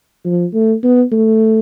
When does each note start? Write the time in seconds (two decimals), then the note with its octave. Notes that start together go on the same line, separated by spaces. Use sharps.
0.25 F3
0.54 A3
0.83 B3
1.12 A3